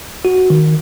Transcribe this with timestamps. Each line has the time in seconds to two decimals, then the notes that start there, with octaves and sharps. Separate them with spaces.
0.25 F#4
0.50 D#3